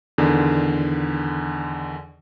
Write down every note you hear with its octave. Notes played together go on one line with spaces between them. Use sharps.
E2 D3 D#3